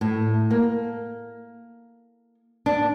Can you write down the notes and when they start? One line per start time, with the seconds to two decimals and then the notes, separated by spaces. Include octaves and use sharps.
0.01 A2
0.50 A#3
2.66 D4